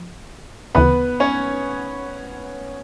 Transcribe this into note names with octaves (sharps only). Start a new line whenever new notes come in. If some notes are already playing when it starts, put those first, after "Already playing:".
Already playing: F3
D2 C#3 E3 B3 B4
C#4 C#5